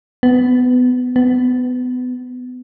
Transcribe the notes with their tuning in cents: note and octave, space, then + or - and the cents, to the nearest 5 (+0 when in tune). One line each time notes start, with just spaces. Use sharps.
B3 +20
B3 +25